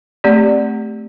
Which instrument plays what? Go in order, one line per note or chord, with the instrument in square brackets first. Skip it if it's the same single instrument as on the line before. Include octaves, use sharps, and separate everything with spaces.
[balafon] A3 C4 G4 D5